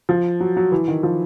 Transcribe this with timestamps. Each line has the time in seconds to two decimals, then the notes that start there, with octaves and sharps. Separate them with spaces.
0.09 F3
0.40 F#3
0.57 F#3
0.72 E3
0.88 D#3
1.03 F3